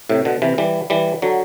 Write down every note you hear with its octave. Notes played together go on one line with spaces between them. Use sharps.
A2 C3
B2 D3
C3 E3
E3 G3
E3 G3
D3 F#3